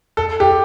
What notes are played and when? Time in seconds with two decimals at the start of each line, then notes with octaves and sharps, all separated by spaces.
0.17 A4
0.40 G4